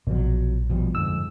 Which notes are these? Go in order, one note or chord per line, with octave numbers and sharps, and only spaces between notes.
A#1 B2 F3 F#3
B2 F3 G3
G1 F2 G#2 E6